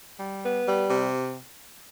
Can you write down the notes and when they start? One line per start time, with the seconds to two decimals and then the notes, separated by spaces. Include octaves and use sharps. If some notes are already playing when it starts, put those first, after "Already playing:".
0.18 G3
0.42 B3
0.65 G3
0.89 C3